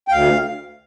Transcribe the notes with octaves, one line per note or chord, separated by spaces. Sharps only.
G5
D2 F5